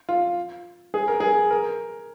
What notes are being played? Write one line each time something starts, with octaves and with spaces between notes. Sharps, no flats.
F4
G#4
A#4
G#4
A#4